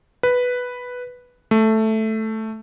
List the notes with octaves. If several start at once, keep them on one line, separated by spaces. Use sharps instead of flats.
B4
A3